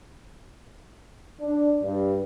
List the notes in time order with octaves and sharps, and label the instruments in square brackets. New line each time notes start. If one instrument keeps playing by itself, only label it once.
[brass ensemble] D4
G2